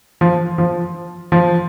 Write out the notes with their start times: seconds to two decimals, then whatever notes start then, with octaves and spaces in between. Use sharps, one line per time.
0.21 F3
0.58 F3
1.32 F3